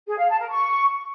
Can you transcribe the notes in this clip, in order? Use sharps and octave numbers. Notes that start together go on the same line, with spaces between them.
G#4
F5
A5
A#4
C#6